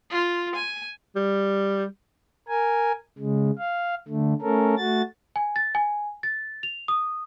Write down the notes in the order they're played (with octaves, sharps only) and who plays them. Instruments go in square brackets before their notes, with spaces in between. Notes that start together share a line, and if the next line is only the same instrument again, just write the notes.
[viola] F4
G#5
[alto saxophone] G3
[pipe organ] A#4 G#5
C#3 G#3
F5
D3 A3
A3 C#4 A4 A#4
A3 F#4 A6
[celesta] G#5
A6
G#5
A6
F7
D#6